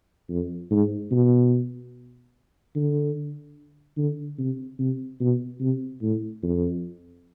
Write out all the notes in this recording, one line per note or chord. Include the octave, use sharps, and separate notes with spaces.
F2
G#2
B2
D3
D3
C3
C3
B2
C3
A2
F2